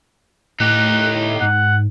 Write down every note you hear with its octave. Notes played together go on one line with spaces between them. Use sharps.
A2 D#4 G4 F#6
G#2 F#5